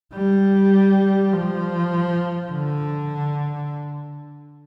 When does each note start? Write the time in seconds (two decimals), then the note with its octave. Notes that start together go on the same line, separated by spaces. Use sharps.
0.14 G3
1.33 F3
2.52 D3